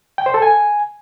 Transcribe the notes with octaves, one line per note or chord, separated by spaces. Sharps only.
G5
C5
A4
G#5